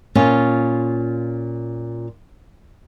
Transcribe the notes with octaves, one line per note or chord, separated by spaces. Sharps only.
A#2 C#4 F4